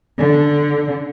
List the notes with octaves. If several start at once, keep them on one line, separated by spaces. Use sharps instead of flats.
D3